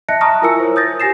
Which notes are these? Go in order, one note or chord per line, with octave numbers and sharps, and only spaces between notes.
D#5 E5 A5 F#6 A#6 C#7
A5 A#5 C#6 D#6 F6 A#6
E4 F4 A#4 G#5 E6 C#7
C5 C#5
D#6 G6 A6 A#6
G4 G#5 A#6 C7 E7